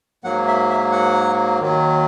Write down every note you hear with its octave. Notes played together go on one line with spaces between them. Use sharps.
G#2 F#3 A#3 F#5
E5
E5
F#5
D#2 D#3 F#3